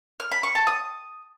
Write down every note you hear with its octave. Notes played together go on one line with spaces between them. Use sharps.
F6
B5
C#6
A5
D#6